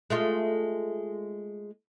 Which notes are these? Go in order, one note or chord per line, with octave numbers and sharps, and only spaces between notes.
G#3 A3 F4